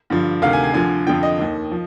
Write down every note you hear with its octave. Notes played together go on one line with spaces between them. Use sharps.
G2 D3 F3
D2 C3 D#3 F5
G#5
G#5
D2 D3 F3 G#5
F2 D3 F3 G5
D#5
D#2 D#3
F3